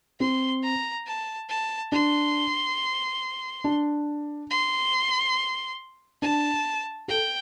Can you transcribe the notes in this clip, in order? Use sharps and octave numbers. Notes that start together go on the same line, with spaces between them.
C4 C6
A#5
A5
A5
D4 C6
D4
C6
D4 A5
A4 G5